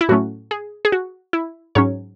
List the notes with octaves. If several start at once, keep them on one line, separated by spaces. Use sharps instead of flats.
E4
A2 F#3 A3 C#4 F#4
G#4
G#4
F#4
E4
G#2 F#3 C#4 C#5